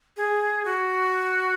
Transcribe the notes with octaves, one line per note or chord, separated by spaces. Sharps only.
G#4
F#4